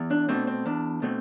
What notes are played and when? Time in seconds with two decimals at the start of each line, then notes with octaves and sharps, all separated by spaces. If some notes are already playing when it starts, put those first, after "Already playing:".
Already playing: E2
0.11 D4
0.29 B2 A3 C4 D4
0.47 C4
0.66 E2 D4
1.02 B2 A3 C4